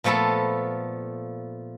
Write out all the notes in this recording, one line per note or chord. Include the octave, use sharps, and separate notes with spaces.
A#2 F3 A3 B3 A4